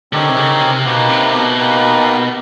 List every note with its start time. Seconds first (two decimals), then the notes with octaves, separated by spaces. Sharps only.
0.12 D3 C4 D#4 G4 A#4 C#5
0.29 C3
0.37 C#3
0.61 C3
0.85 B2 A#3 D#4 G4 B4
1.09 C3
1.34 B2
1.58 A#3 D#4 G4 B4